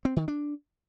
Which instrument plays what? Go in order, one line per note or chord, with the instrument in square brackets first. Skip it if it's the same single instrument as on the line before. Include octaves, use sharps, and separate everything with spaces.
[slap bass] C4
D#3
D4